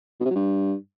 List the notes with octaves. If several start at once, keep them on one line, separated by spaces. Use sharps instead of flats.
B2
C3
F#3
G2